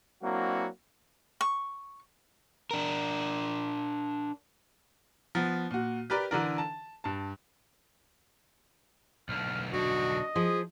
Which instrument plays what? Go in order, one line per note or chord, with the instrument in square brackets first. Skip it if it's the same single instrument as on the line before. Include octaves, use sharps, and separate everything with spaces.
[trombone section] F#3 A#3 C4 D4 E4 F#4
[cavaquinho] C#6
[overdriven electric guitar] D4 A#4
[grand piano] F3 B3
A#2 F#4
G4 A#4 B4 D5
D3 E3 D4 A#4
A5
G2 A5
[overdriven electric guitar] B1 D3 [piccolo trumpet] F6
[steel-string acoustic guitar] D4 [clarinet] F#4 [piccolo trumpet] D#5
[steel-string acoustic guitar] F3 [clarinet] G#4